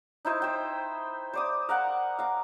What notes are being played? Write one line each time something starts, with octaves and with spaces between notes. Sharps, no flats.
D#4 E4 C5 D#5
C5 G5
C5 D5 D#6
A#4 F5 F#5
F5 A#5